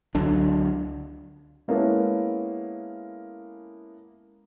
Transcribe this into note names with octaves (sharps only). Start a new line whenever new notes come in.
C#2 D3 F#3 D4
G#3 A#3 B3 C#4 E4 A4